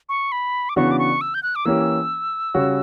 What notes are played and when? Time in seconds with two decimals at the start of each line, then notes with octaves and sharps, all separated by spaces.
0.09 C#6
0.32 B5
0.69 D6
0.76 C#3 E3 B3 D4 F#4 C#6
0.91 D6
0.99 C#6
1.21 E6
1.34 G6
1.43 F#6
1.56 D6
1.65 E3 A#3 C#4 G4 E6
2.54 C#3 G3 C#4 F#4